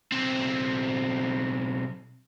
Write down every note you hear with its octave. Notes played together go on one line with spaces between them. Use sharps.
B1 C4